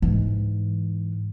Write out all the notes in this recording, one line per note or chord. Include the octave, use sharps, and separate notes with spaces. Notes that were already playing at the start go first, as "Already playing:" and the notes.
G#2 E3